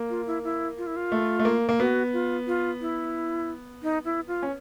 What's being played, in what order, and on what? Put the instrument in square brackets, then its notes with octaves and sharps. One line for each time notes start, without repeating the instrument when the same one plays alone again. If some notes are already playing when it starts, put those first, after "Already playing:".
Already playing: [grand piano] A#3
[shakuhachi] F4
E4
E4
F4
E4
F4
[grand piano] A3
A3
A#3
A#3
[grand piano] B3 [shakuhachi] F#4
[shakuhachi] F4
F4
E4
D#4
E4
F4
[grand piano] C#4